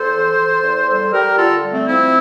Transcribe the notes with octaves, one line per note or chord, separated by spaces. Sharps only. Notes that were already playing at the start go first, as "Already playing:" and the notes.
Already playing: E2 A4 C5
E3
E3
E2
G3 A4 C5
G3 G4 A#4
D3 F4 A4
G3
A3 C4
F3 C4 E4